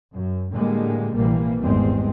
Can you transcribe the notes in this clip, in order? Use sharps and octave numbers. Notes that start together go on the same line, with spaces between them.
F#2
A2 D3 G3 G#3 A#3
A#1 C3 E3 G3 A#3
G#1 E2 G3 G#3 C4